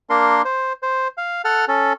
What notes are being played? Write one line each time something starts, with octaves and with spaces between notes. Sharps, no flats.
A#3 D4 A#4 C6
C5
C5
F5
A4 F#5 F6
C#4 A4